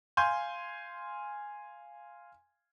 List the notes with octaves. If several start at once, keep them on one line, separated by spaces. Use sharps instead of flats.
F5 G#5 C6 G6